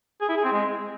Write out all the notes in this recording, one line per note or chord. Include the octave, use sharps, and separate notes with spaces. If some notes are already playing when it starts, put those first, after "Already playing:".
G#4
E4
G#4
C4
G#3